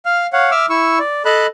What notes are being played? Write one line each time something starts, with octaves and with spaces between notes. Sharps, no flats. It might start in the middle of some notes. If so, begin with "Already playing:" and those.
F5 F6
C#5 F5 F#5
E5 D6 E6 F6
E4 C#6 E6
D5
A4 D#5 A5 B5 F#6